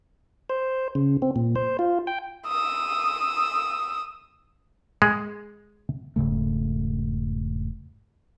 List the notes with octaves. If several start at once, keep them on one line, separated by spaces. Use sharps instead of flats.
C5
C#3
C4
A#2
C5
F4
G5
D#6 E6
G#3
E1 G#2 C#3 A3